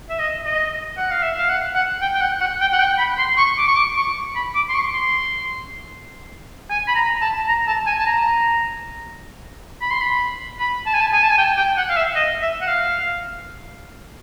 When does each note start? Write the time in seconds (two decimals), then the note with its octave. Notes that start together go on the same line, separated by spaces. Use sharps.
0.10 E5
0.19 D#5
0.46 D#5
0.97 F#5
1.11 F5
1.23 E5
1.38 F5
1.49 F#5
1.75 F#5
2.02 G5
2.14 G5
2.21 F#5
2.40 F#5
2.60 G5
2.73 F#5
2.80 G5
2.99 B5
3.18 C6
3.37 C#6
3.58 D6
3.68 C#6
3.76 D6
3.96 C#6
4.36 B5
4.55 D6
4.69 C6
4.74 C#6
4.94 C6
6.70 G#5
6.88 B5
6.95 A#5
7.21 A5
7.48 A#5
7.68 A5
7.87 G#5
7.99 A5
8.06 A#5
9.81 B5
9.91 C6
10.01 B5
10.60 B5
10.86 A5
10.94 G#5
11.01 A5
11.13 G#5
11.23 A5
11.30 G#5
11.38 G5
11.57 G5
11.77 F#5
11.90 F5
11.97 E5
12.16 D#5
12.42 E5
12.61 F#5
12.68 F5